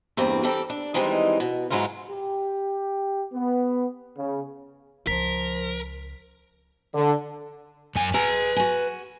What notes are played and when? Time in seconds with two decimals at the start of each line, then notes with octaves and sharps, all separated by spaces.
0.17 E2 G2 A#3 C4
0.43 E3 G3 C4 G4 A4 A#4
0.70 D4
0.94 D#3 E3 G3 G#3 C4 D#4
1.40 B2
1.71 G#2 F#3 G#3 E4 F4
2.09 G4
3.31 B3
4.17 C#3
5.07 C#2 F3 A#4 B6
6.94 D3
7.96 F#2 G#5
8.14 G#4 B4 A#5
8.56 F#4 G#5